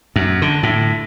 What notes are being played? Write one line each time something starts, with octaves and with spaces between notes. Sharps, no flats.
F#2
D3
A2